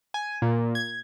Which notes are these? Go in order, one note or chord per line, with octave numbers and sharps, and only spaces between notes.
G#5
A#2
G#6